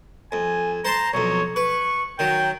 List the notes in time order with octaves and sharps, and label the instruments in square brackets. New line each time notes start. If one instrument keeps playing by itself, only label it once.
[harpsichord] F2 [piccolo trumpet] G#5
[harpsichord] C5 A5 C6 [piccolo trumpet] A#5
[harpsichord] B1 F2 [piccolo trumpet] C#5
[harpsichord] B4 [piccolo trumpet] C#6
[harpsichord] D#3 F#3 [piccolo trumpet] G5